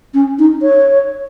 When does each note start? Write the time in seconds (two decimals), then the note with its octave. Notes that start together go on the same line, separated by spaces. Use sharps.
0.14 C#4
0.39 D#4
0.62 C#5